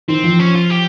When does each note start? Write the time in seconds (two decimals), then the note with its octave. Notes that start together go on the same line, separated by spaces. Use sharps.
0.08 D#3 C4
0.24 F3
0.40 C#4
0.55 F4
0.70 G4